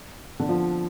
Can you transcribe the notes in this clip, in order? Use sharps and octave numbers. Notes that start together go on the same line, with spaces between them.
D3
F3